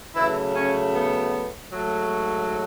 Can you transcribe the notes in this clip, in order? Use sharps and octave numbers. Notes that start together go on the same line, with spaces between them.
C#3 E3 F#3 A3 E4
C#4
B3
G#2 F#3 A3